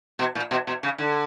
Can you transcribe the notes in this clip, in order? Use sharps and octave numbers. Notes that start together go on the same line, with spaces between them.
B2
A#2
B2
B2
C#3
D3